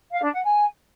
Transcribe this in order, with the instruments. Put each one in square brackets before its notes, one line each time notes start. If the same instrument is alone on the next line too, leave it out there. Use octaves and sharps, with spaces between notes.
[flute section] F5
D4
F#5
G#5